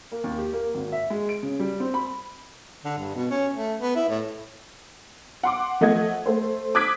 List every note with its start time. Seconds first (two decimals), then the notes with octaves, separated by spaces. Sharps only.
0.12 A#3
0.24 D#2
0.38 G4
0.53 A#3
0.74 G#1
0.92 E5
1.10 G#3
1.29 D7
1.43 C#3
1.59 G3
1.80 C4
1.94 B5
2.84 D3
2.98 G2
3.15 B2
3.31 C#4
3.56 A3
3.80 B3
3.95 E4
4.09 A2
5.43 F#5 C6 D6
5.81 F3 A3 D#5 F#5 G#6
6.26 A3 C5
6.75 D6 D#6 F#6 G#6 B6 D7